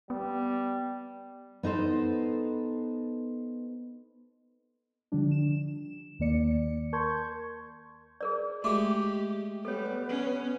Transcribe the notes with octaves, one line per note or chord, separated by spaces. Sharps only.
G3 B3
B3 D#4 A4 C5
D3 F3 G3 D4
E7
D#2 D#3 A#3 D5 C#7
A#4 A5 C6 C#6 G6 G#6
G#4 A#4 D5
G#3 A3 F#4 G4 D6
G3 B3 A4 C#5
C#4